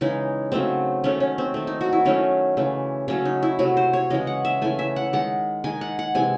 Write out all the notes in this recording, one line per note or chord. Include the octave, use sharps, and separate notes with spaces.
C#3 E3 G#3 D#4
C#3 F#3 A3 C4
D#3 F#3 A3 C#4
C#4
C4
D#3 A3
D#4
F#4
E4
D#3 F#3 A3 C#4
C#3 E3 A3
C#3 F#3 A3 C#4
D#4
E4
C3 F#3 A3 F#4
C5
C#5
C#3 E3 G#3 D#5
F#5
E5
C#3 E3 A3 G#5
E5
F#5
D#3 G#3 F#5
D#3 G#3 G#5
F#5
F#5
C3 E3 G#3 G#5